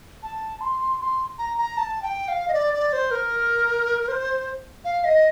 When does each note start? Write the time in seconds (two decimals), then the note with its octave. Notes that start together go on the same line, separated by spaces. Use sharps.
0.23 A5
0.61 C6
1.00 C6
1.38 A#5
1.58 A#5
1.77 A5
2.02 G5
2.28 F5
2.48 D#5
2.54 D5
2.74 D5
2.93 C5
3.11 A#4
4.08 C5
4.85 F5
5.05 D#5